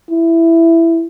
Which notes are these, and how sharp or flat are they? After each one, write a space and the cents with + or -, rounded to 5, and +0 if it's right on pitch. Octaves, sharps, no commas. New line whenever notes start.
E4 +10